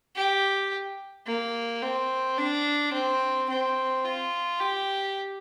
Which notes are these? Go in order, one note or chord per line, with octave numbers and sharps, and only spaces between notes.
G4
A#3
C4
D4
C4
C4
F4
G4